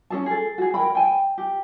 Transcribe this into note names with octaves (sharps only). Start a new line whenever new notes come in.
C#4 G#4 A5
G#4 A4
F#4 G#4
A#4 G5 B5
G5 G#5
G4